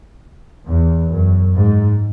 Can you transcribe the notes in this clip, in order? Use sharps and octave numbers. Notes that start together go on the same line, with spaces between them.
E2
F#2
G#2